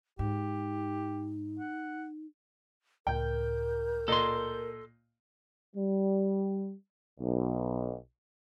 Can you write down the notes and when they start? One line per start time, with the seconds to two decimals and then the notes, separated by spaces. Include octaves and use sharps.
0.19 G#2 D#4 G4
1.59 F#5
3.07 C#2 A2 A#4 G5 G6
4.08 A#2 A4 D#5 C6
5.75 G3
7.20 B1